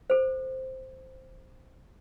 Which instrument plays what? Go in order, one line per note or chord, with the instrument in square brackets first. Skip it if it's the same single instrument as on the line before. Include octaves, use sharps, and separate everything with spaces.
[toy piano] A4 C5